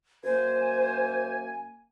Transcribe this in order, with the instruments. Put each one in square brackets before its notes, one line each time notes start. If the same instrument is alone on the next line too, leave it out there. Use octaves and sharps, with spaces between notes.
[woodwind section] F#2 A#3 G#5 [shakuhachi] C5